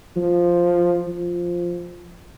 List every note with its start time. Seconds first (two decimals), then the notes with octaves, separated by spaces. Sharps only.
0.16 F3
1.08 F3